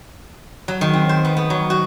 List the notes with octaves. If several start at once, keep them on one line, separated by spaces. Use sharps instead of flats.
F#3
D#3
C4
C5
B3
B3
F#3
F#4